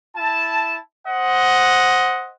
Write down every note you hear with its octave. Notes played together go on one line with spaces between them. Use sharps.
E4 A5
C5 D#5 F#5